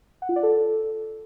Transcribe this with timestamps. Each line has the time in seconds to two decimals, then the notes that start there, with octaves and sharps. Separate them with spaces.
0.22 F#5
0.29 F4
0.36 D5
0.43 A4